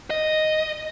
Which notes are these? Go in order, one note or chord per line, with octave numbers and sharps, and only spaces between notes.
D#5